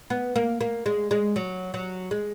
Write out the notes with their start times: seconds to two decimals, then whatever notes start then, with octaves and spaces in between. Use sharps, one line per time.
0.10 B3
0.36 A#3
0.61 A#3
0.86 G#3
1.11 G#3
1.36 F#3
1.74 F#3
2.11 G#3